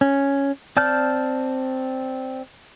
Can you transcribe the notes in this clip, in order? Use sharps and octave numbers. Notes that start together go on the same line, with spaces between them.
C#4
C4 D5 A5 F6 G6